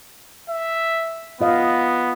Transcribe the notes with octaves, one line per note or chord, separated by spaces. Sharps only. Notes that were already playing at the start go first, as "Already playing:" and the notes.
E5
B3 F4 D#5 F5